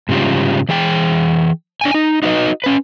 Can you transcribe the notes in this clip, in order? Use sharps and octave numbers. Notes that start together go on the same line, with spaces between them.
G#2 C#3 G3 F4 G4
E3 G#4 G5
D4 G5 G#5
D#4
D#4 F#4 B4 C#5 D#5
C#4 B4